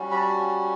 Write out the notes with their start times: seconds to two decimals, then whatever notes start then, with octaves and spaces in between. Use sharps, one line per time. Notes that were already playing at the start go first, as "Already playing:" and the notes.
Already playing: G3 C#4 F#4
0.11 B5
0.16 A5